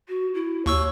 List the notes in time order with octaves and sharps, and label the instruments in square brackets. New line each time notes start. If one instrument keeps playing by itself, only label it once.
[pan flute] F#4
E4
[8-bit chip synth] D#2 C#6 E6 [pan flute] C#5